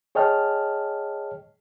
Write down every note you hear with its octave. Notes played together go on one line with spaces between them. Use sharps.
G#4 C#5 D#5 G5 A5 F6